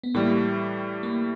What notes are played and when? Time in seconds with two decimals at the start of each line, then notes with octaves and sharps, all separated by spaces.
0.03 B3
0.14 A2 E3 G3 A#3
1.03 A#3